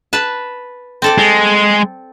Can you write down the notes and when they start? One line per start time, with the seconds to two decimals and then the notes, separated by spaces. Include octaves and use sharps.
0.13 B4 A5
1.02 C4 A4 D5
1.18 G#3